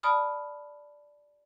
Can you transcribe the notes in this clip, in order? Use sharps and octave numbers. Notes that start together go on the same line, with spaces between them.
D5 A5 B5 D#6 F6